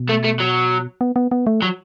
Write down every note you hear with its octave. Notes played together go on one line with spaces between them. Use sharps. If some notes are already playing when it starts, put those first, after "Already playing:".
Already playing: B2
A3
A3
F#3
B3
B3
B3
A3
F#3